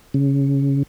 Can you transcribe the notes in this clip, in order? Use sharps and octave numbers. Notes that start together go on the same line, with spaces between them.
C#3